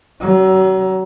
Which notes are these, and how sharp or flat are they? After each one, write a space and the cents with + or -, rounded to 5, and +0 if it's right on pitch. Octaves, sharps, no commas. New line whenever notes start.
F#3 +35 C#4 +0